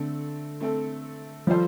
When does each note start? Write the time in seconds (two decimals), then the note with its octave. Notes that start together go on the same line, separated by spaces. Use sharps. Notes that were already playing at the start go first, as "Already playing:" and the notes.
Already playing: D3 A3 C4 A4
0.61 A3 C4 A4
1.47 F3 G3 F4 A4 C5